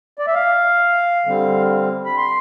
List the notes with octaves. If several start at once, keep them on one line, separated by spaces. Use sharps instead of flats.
D5
E5
F5
D3 G3 C4
B5
C6